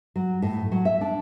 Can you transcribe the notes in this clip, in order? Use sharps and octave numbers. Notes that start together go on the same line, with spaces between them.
F#3
A2
F#3
E5
D4